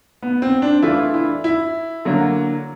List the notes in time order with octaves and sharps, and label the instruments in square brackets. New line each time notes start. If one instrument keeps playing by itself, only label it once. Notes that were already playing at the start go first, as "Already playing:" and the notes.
[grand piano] B3
C4
D4
[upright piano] E3 A3 D4 F4 [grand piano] E4
[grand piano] E4
E4
[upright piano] D3 F#3 A#3